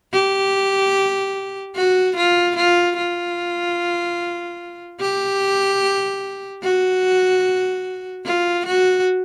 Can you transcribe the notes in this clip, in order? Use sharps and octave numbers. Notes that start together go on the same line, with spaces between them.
G4
F#4
F4
F4
F4
G4
F#4
F4
F#4